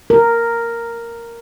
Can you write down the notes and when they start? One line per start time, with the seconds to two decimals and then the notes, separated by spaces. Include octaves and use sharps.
0.10 A#4